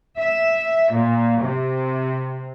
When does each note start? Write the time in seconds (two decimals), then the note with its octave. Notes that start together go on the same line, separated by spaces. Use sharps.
0.18 E5
0.93 A#2
1.40 C3